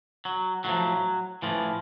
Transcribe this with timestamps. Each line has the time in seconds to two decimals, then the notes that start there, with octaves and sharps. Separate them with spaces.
0.25 F#3
0.64 A2 F3 F#3
1.42 A2 E3 F3